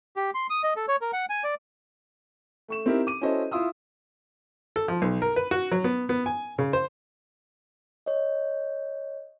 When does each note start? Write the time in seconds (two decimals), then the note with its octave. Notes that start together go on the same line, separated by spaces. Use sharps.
0.16 G4
0.34 C6
0.50 D#6
0.64 D#5
0.76 A4
0.88 C#5
1.01 A#4
1.13 F#5
1.30 G#5
1.44 D5
2.68 A3 C#6 E7
2.86 C4 D#4 E4 G4 A#4
3.07 D6 D#7
3.21 C#4 E4 F#4 A4 C5 D#5
3.51 E4 F4 C6 D#6 E6
4.76 A4
4.88 F3
5.02 B1
5.22 A#4
5.36 B4
5.51 F#4
5.72 F#3
5.84 B3
6.09 B3
6.26 G#5
6.58 C#3
6.73 C5
8.06 C#5 D#5